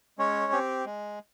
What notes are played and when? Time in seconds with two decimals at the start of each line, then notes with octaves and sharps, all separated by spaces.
0.18 G#3 C#4 C#5
0.52 C4 G4
0.86 G#3